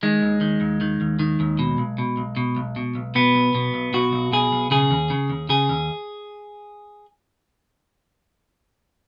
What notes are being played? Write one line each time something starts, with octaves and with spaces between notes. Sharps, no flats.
D#3 G#3
D#2
D#3
D#2
D#3
D#2
D#3
D#2
B2
B1
B2
B1
B2
B1
B2
B1
B2 B3
B1
B2
B1
B2 F#4
B1
B2 G#4
B1
C#3 G#4
D#2
C#3
D#2
C#3 G#4
D#2